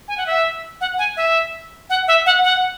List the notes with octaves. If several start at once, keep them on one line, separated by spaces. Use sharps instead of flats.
G#5
F#5
E5
F#5
G#5
E5
F#5
E5
F#5
F#5